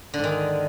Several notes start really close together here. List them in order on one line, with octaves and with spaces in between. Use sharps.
D3 G#2 D#3